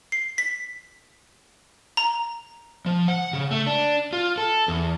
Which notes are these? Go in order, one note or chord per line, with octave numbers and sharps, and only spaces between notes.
C7
B6
A#5
F3
F#5
C#3
A3
D4
F4
A4
E2